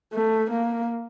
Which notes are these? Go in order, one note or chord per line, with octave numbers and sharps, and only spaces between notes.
A3
A#3